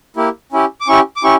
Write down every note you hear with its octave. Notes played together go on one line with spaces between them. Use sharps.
A#3 E4 G4
C#4 E4 G4
D6
C#4 E4 G4 C#6
D6
C#4 E4 G4 C#6